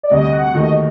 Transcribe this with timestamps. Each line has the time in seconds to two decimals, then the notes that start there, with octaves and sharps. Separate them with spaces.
0.03 D5
0.10 D2 C3 G3 D#5
0.32 F#5
0.54 D#2 D#3 A3 D#4 F#4 D#5